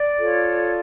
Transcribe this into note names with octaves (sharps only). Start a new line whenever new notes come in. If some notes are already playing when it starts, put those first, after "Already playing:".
Already playing: D5
F4 A4 C#5